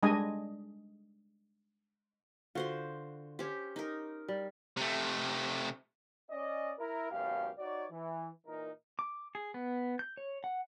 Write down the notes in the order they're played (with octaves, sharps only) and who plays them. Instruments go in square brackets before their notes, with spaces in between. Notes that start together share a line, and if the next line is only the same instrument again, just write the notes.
[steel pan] G3 G#3 D4 D#5 G#5
[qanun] D3 C5 C6 [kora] F4 F#4
[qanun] C#4 G4 [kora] C5
[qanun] D#4 A#4
[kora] G3
[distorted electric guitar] C3 A3
[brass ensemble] C#4 D5 D#5
E4 A#4
G#1 F#2 B2 G4 F5
D#4 F#4 C#5 D5
E3
A#2 E3 D#4 A#4
[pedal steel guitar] D6
G#4
B3
G6
C#5
F#5